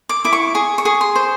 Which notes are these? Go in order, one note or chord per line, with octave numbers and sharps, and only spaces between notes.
D6
E4 D6
C#6
G#4 C#6
C#6
G#4
C6
C5